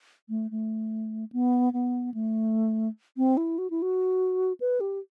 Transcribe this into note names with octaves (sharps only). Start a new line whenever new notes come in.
A3
A3
B3
B3
A3
C4
E4
F#4
E4
F#4
B4
G4